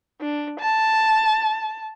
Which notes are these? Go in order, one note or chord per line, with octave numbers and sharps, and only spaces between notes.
D4
A5